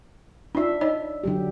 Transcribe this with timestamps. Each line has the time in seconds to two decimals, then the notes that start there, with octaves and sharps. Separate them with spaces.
0.55 D4 D#4 F4 E5
0.81 D#4 C#5 D#5
1.24 D3 F#3 G4